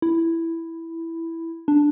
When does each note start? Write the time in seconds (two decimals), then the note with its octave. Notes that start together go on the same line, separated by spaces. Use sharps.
0.02 E4
1.68 D4